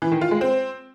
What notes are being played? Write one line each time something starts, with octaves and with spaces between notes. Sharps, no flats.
E3
D#3
F4
G#3
C4